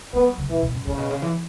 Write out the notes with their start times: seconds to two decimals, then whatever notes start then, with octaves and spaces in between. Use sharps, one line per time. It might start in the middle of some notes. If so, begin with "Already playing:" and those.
0.13 A3 B3
0.26 F#3
0.38 C#3
0.49 B2 E3
0.63 B2
0.74 F#2
0.86 A2 C#3
0.98 B2
1.11 C#3
1.22 E3